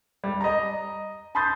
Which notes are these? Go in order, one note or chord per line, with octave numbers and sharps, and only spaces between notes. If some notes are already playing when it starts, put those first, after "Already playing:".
G3
D#5 A#5
A5 B5 C6 D#6 G6 A6